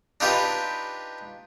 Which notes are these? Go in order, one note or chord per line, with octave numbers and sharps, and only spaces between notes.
D4 D#4 F4 G4 B4